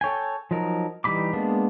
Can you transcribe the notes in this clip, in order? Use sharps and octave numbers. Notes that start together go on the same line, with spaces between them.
A4 C#5 G5 G#5
F3 F#3 D#4 A#4
E3 G3 D#4 B5 D6
G#3 A#3 B3 D4